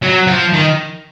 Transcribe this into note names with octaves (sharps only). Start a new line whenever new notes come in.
F#3
F3
D#3